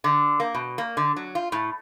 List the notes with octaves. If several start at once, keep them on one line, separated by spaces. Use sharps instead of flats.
D3
A#3
B2
A#3
D3
F#3
F4
A2